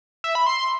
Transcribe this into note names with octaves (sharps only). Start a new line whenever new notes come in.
E5
B5
C6